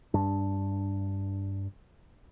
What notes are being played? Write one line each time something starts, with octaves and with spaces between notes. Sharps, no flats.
G2 D4